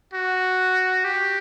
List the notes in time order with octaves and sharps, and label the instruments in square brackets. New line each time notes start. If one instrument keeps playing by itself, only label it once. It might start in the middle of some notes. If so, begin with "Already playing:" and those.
[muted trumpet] F#4
G4